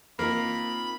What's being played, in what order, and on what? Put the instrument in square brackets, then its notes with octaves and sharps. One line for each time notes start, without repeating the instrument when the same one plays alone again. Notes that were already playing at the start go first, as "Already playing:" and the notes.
[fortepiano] A#3 [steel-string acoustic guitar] C4 D#4 F4 [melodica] B5